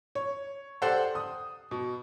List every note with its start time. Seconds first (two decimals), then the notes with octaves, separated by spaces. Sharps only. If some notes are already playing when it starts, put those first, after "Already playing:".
0.15 C#5
0.82 G4 A4 C5 D5 F#5 C6
1.15 D#6
1.71 B2